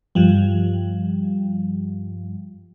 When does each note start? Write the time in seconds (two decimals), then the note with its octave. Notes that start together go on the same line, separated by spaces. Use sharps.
0.15 G2 F3 G3